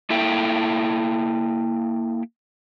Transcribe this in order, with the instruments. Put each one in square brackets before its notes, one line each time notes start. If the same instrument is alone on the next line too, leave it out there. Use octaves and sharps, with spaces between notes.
[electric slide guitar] A#3 E4 A4 E5 G5